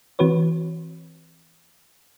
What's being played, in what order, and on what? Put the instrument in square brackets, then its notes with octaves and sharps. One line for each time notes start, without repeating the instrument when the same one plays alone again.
[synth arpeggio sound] E3 C4 F#4 B4 C#5